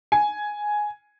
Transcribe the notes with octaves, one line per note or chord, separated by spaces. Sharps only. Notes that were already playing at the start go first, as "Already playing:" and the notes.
G#5